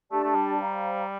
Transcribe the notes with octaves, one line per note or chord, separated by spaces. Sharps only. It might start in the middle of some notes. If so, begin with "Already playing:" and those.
A3 D4 G4 D5 A5
A3
G3
C5 F5 A#5